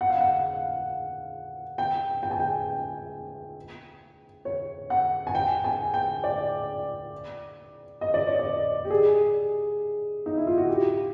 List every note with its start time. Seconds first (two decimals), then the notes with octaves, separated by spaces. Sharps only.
0.01 F#5
0.10 F5
0.21 F#5
1.78 G5
2.23 G5
2.31 G#5
2.40 G5
4.45 C#5
4.90 F#5
5.27 G#5
5.35 G5
5.64 G#5
5.94 G5
6.24 D5
8.01 D#5
8.14 D5
8.27 C#5
8.39 D5
8.85 G4
8.90 G#4
10.26 D#4
10.37 E4
10.47 F4
10.58 F#4
10.69 G4